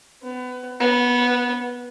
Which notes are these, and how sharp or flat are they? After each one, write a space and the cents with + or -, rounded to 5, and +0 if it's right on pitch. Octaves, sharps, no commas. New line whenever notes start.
B3 +25
B3 -15